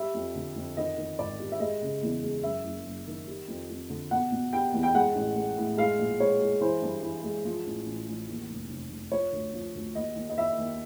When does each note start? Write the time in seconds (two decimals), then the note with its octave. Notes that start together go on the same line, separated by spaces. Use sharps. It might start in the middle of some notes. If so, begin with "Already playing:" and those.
Already playing: G3 E5
0.14 F2
0.35 D3
0.56 F2
0.77 D#3 D#5
0.97 D#3
1.19 G#1 D5
1.39 G3
1.52 E5
1.60 G#3 D#5
1.82 C#3
2.03 E2
2.23 G#3
2.43 F#2 E5
2.65 F#1
2.86 F#1
3.07 D#3
3.27 G3
3.48 F2
3.70 F2
3.90 D3
4.11 B2 F#5
4.32 B2
4.52 G3 G5
4.74 E2
4.83 G5
4.94 G#3 F#5
5.15 A1
5.36 G#3
5.57 A2
5.77 G#3 F5
5.99 A#1
6.20 G#3 C#5
6.40 G#3
6.61 E3 C5
6.82 G2
7.03 E3
7.24 G#3
7.45 F3
7.66 A1
7.86 A1
8.08 A1
8.29 D#2
8.50 F1
8.70 F1
8.90 F1
9.11 F3 C#5
9.33 D2
9.54 F3
9.75 D2
9.95 D#2 D#5
10.16 D#2
10.29 D#5
10.37 D#2 E5
10.58 D#2